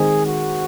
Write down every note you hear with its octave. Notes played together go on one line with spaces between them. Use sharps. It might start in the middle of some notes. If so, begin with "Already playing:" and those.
Already playing: D#3 G#3 C4 G#4
F#4